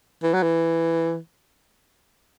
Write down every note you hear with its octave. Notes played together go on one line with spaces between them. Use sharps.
E3
F#3
E3